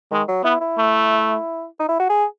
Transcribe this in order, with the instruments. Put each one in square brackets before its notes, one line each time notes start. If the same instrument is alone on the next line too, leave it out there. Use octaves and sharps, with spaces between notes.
[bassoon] D#3 [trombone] G#3
[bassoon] F#3
[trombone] B3 [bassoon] E4
[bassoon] E4
[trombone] A3
[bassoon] D#4
E4
F#4
G#4